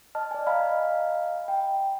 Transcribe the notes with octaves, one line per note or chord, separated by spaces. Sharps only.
D#5 A5 F6
D5 G#5
D#5 F5 G#5 A#5 B5 F6
G5